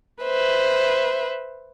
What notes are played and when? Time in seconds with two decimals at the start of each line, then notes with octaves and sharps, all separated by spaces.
0.25 B4 C5 E5